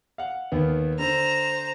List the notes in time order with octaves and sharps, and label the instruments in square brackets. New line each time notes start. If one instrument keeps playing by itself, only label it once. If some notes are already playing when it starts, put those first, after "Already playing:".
[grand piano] F5 F#5
D#2 D#3 B3
[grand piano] D3 [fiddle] C5 A#5